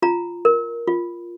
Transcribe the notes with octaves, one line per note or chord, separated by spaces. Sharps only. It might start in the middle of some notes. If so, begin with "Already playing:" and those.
F4 A#5
A#4
F4